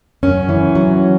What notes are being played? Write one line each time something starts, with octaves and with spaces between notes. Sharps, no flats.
F#2 C#4
E3
F#3